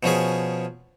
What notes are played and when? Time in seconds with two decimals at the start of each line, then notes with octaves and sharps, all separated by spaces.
0.03 B2 F3 C#4 G#4